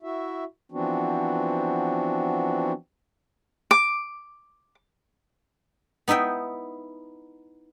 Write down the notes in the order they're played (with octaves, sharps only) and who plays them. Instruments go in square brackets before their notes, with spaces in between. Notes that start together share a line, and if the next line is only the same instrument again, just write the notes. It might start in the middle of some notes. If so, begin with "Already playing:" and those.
[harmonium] E4 F#4 E5
E3 F3 B3 C4 D4 F#4
[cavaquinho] D6
[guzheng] B3 D#4 E4 E5 G5